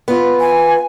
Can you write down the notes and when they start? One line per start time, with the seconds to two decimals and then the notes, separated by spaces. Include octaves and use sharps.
0.08 B3 F4
0.40 G#5